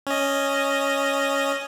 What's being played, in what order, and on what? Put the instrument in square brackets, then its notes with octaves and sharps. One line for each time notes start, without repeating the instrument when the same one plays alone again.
[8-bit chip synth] C#4 D#5